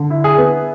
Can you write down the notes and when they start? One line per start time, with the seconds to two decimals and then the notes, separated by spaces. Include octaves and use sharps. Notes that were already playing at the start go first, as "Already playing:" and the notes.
Already playing: D3
0.10 E4
0.24 G#4
0.38 B3